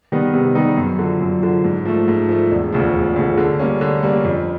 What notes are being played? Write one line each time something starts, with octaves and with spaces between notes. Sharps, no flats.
D#3 G3 B3 D#4
C3
D#3 G3 B3 D#4
F#2
D3 F3
F#2
D3 F3
G#2
F3 A3
G#2
F3 A3
E1
D2 C#3 F3
E1
D2 C#3 F3
D3
G3 A#3 C#4
D3
G3 A#3 C#4
F2